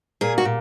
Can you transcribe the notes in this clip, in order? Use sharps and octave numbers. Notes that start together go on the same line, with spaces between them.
A#2 G#4
F#4
A#2